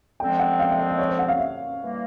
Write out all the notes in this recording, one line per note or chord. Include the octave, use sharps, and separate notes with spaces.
D3 F3 G#3 C4 G5
F#5
F5
E5
D#5
D#5
C#5
C5
F#5
F5
E5
E3 G3 A#3